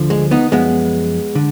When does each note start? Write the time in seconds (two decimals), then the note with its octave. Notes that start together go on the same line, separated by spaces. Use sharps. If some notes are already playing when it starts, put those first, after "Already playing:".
Already playing: D2 D3 F3
0.10 G#3
0.31 B3 D#4
0.51 F#2 F3 G#3 B3
1.35 D3